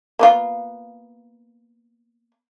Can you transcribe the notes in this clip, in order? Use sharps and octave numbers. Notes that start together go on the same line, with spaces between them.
A#3 B3 F4